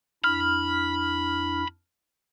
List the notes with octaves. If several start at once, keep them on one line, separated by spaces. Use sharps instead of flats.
F2 D4 E4 B5 F6